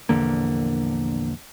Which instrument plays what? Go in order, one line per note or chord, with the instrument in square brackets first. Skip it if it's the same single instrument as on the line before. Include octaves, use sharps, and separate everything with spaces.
[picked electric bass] A#1 E2 D3 A#3